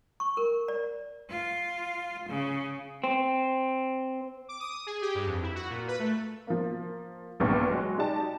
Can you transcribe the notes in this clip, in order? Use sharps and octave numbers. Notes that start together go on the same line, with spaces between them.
C#6
A#4
D5
F4
C#3
C4
D6
D#6
G#4
G4
G2
F2
E4
F#4
A#2
B4
A3
F3 A#3
A#1 E2 G2 A#2 B3 C#6
F#3 G#3 F#4
D#4 G4 D5 A5